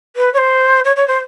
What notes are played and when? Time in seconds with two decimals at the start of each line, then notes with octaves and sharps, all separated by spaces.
0.16 B4
0.34 C#5
0.38 C5
0.85 C#5
0.96 C#5
1.08 C5